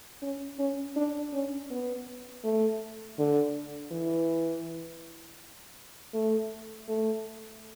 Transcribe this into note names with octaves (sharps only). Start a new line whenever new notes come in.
C#4
C#4
D4
C#4
B3
A3
D3
E3
A3
A3